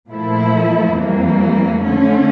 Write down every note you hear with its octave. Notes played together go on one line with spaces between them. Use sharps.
A#2 F3 A3 E4
F2 E3 G3 A#3
D3 A3 C#4